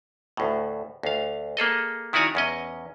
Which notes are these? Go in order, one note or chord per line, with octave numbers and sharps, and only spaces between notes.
D2 A2
D2 F5
A#3 G#4 A4 D#5
D#3 E4 F#4 D5 G#5 A#5
E2 C#4 D#5